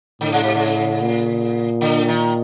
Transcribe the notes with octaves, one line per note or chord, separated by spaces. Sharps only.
A2 D3
C#3
C3
C#3
A#2
D3
D#3